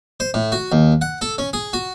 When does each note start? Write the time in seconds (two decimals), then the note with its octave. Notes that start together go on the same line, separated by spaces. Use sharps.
0.20 C5
0.34 A2
0.52 F#4
0.72 D#2
1.02 F#5
1.22 A4
1.38 C#4
1.53 G#4
1.73 F#4